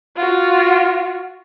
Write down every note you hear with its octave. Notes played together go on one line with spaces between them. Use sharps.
F4 F#4